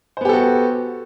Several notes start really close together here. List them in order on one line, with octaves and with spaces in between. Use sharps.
C5 B3 G4 A4 F#4